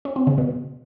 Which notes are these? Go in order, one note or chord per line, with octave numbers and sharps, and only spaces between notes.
C#4
C4
C#3
B2